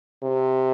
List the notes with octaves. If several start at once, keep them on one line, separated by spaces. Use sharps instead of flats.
C3